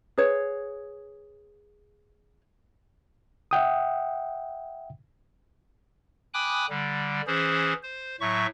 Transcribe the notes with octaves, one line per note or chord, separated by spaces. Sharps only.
G#4 B4 C#5
E5 F#5 G5 D#6
G5 G#5 B5 D6 D#6 F#6
D3 G3
E3 C#4 G#4 C5
C5
A2 F#3 E5 C#6